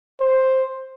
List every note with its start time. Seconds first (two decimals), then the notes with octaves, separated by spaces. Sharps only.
0.21 C5